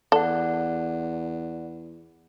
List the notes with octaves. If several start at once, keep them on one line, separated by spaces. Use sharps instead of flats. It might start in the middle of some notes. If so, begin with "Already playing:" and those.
E2 A4 D5 F#5